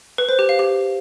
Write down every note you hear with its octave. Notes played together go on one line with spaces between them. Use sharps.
B4
C5
G4
F5
G4